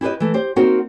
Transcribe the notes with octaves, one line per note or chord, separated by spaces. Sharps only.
E4 G4 G#4 B4 D#5
E3 A3
G4 C5
A#3 C4 D#4 F#4 A#4 C5